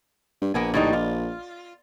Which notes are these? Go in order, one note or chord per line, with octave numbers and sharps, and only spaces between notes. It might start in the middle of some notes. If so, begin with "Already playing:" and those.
G2
A#1 A#3 B3 G#5
A2 G3 D#4
F4